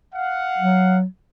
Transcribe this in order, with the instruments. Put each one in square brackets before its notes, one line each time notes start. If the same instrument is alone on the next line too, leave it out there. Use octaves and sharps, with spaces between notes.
[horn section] F5 F#5
[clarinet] F#3